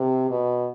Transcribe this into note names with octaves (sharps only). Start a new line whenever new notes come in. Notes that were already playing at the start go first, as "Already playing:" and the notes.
Already playing: C3
B2